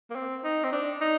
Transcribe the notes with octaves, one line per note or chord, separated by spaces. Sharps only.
A#3
C4
D#4
C4
D4
D#4